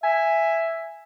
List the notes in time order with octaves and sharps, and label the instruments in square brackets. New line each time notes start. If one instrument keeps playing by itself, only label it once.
[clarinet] E5 [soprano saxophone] G#5